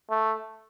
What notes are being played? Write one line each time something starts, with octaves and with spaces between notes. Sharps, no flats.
A3